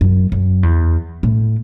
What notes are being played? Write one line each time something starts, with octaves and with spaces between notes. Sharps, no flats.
F#2
F#2
E2
A2